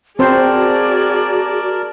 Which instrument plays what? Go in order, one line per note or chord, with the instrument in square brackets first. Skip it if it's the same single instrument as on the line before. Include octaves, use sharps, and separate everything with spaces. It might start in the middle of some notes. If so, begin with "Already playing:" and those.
[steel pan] C4 C5 [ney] F#4 [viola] G#4 D5 [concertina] A#4 A5